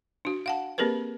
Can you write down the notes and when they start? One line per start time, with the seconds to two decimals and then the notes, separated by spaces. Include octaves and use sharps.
0.25 D4 F#4
0.46 F5 F#5 A5
0.78 A#3 C4 G4 G#4 A#4 B4